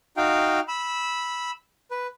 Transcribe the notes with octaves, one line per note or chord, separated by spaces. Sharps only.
D#4 F#4 F5 G5
B5 E6
B4